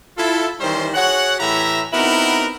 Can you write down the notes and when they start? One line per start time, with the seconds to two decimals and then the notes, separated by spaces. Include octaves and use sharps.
0.18 E4 F4 A4
0.60 D#3 E3 G3 C#4 C5
0.94 F#4 G#4 C#5 F#5
1.39 A2 E3 E4 G4 E5 A#5
1.93 B3 C4 D#4 E4 F#4 A#4